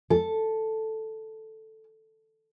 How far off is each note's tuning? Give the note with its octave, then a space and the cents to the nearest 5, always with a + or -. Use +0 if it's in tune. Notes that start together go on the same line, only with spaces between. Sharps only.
A4 +0